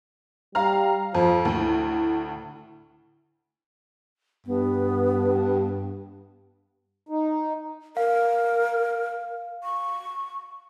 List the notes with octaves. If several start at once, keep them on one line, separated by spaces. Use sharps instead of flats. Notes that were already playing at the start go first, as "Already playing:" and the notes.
G3 F5 A#5 F6
F2 F3
D2 A2 E4
G2 B3
D#4
A#4 F5
C#6